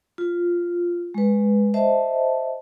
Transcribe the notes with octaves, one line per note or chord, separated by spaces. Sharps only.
F4
G#3 B4
C5 D#5 E5 A5